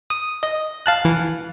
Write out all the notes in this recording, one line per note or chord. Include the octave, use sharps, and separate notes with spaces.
D#6
D#5
F5 A5 F#6
E3